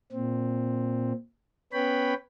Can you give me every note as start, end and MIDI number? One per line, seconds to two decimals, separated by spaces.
0.12 1.12 46
0.12 1.12 60
1.73 2.14 59
1.73 2.14 61
1.73 2.14 71
1.73 2.14 73
1.73 2.14 79
1.73 2.14 83